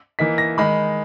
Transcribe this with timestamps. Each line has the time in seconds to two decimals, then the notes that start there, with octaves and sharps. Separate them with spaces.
0.19 E3 A#3 D#4 B6
0.38 A#6
0.58 D#3 G#3 D#4 B5